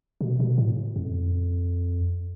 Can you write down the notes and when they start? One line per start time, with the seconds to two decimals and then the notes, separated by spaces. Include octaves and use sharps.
0.21 B2
0.40 B2
0.58 A2
0.96 F2